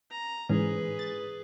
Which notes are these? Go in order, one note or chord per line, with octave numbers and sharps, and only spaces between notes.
A#5
G#2 E3 C#4 G#4 B4
A6